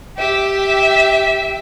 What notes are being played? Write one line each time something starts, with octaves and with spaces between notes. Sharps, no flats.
G4 E5